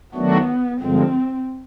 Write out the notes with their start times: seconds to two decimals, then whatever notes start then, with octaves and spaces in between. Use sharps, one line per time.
0.14 D#3 F#3 A3 B3 D4 F#4
0.80 G2 D3 F3 G#3 C4